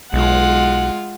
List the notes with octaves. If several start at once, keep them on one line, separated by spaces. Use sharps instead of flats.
B1 G#3 F4 F#5